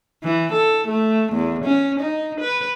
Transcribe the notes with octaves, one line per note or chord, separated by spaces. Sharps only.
E3
A4
A3
E2
C#4
D#4
B4